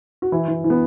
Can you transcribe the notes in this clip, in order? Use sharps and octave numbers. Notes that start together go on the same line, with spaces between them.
F#4
E3 E4
E3
E3
B3